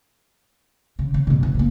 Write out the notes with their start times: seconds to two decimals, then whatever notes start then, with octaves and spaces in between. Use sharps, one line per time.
0.99 C#3
1.14 C#3
1.27 G2 B2
1.43 F#1
1.55 C#3 A#3